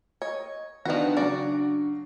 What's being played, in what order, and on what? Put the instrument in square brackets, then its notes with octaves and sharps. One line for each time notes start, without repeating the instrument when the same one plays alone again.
[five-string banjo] C#5 [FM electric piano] D#5
[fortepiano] D#3 B3 [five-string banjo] F3 F#4 [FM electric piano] D4 A#6
[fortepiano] C#3 F#3 [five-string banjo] F#4 D5